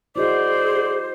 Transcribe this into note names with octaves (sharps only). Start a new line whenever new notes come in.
E4 F#4 G#4 C5 D5 D#5